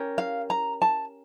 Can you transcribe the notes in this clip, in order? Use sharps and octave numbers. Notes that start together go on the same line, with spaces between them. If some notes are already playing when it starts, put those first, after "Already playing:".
Already playing: C#4 G4 A#4
F5
A#5
A5